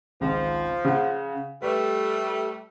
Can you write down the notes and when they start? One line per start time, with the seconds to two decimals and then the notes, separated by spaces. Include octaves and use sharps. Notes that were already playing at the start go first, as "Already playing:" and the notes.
0.21 G#1 C#2 F3
0.85 C#3 F#5
1.62 G3 A3 B4